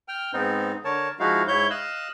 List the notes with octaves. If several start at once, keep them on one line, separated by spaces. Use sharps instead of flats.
G5 F6
G#2 B3 C4 D#4
D3 A#4 C#5 A5
F3 G#3 D#4 E4 F#4 F5
G#2 E4 C#5 G6
D#5 F5 E6 F#6